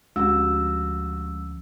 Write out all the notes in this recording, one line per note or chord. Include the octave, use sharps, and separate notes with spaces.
D2 F3 G#3 C#4 F#4 E6